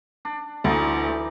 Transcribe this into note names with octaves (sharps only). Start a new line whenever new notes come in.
D4
D2 E3 D#4 D5